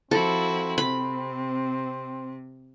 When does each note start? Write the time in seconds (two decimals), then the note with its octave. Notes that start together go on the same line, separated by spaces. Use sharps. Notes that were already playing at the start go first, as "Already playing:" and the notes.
0.11 F3 C4 E4 F#4 A4
0.78 C3 B5